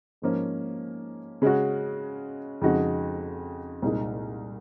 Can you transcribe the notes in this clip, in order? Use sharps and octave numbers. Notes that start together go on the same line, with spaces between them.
G#2 F3 A#3 C#4
C#3 G#3 C#4 F#4
F2 C#3 G#3 D#4 F#4
C2 A#2 G#3 D#4 G#4